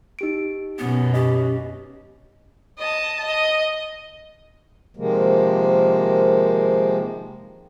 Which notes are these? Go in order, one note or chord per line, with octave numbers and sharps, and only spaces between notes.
D#4 G4 D7
F#2 B2 B3 C#4
G4 D#5
D#5 A5
D#5
C3 D#3 F3 G#3 A#3